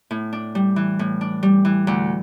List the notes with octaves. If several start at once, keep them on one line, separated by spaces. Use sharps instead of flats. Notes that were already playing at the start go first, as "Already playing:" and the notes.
A2
D4
G3
E3
A2
D4
G3
E3
D2